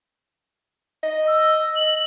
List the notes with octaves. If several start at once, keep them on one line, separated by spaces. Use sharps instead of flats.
D#5
E6
F#7